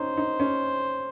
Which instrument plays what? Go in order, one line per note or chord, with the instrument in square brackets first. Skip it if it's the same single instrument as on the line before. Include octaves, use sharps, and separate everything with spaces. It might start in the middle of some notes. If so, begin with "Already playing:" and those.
Already playing: [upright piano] C#4 D#4 [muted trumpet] C5
[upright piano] D#4
C#4